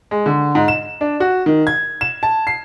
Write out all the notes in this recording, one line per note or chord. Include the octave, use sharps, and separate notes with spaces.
G#3
D3
G#2
E7
D4
F#4
D#3
G#6
E7
A5
C7